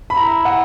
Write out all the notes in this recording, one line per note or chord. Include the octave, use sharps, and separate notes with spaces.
B5
E4 A#5
F#5